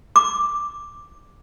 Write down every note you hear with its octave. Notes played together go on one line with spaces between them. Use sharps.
D6